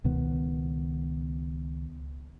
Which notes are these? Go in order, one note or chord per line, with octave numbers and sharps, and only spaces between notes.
C#2 B2 D#3 B3